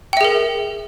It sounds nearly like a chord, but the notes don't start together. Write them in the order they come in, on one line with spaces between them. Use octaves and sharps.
G5 E5 G#4 A#4